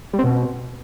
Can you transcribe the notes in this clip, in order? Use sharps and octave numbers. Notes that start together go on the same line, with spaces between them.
G3
C4
B2